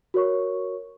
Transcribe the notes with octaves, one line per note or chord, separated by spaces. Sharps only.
F#4 A#4 C#5 C#6